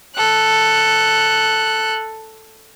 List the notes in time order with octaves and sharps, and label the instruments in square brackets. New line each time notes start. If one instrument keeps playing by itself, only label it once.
[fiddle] A4 F#6